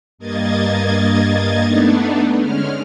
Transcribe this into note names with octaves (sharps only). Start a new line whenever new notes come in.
G2 A#3 D#5 G#6 A6
A3 B3 D4 D#4
D3 G#3 C#4 F6